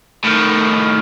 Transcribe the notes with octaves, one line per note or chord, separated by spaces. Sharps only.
A2 D#3